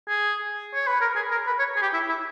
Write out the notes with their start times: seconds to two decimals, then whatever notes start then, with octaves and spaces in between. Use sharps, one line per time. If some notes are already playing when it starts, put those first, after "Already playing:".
0.08 G#4
0.74 C#5
0.87 B4
1.01 A#4
1.16 G#4
1.31 A#4
1.47 B4
1.59 C#5
1.76 G#4
1.82 G4
1.93 E4
2.09 E4